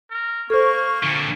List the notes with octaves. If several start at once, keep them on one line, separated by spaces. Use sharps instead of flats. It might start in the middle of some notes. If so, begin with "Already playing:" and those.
A#4
A#3 A4 C5 C#6
A#2 D3